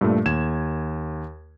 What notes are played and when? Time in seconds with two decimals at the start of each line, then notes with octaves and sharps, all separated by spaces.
0.01 G2 A#2 A3
0.26 D#2 G#6 E7